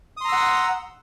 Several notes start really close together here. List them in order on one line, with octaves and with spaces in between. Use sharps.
D#6 C6 A#5 E6 F#5